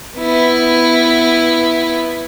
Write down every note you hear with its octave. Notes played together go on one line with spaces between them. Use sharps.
B3 E4